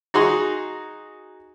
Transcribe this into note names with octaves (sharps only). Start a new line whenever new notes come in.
D#4 F#4 G#4 C6